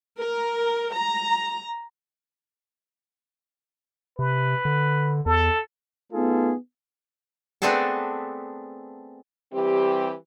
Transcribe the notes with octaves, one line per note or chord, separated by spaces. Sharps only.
A#4
A#5
C3 B4
D3
E2 A4
A3 B3 D#4 F4 G#4 A4
A3 B3 C4 D4 G#4 A4
E3 G3 C4 G4